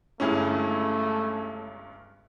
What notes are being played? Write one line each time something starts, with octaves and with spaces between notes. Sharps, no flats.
G1 C#2 G2 A3 C#4 E4 G#4